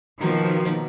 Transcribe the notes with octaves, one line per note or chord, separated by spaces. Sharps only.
B2 D#3 F3 F#3 A#3
B2 F#3 A#3